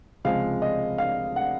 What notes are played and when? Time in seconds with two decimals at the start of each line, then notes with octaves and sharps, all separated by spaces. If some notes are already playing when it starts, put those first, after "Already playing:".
0.24 C#2 C3 F3 G#3 F5
0.62 D#5
0.98 F5
1.36 F#5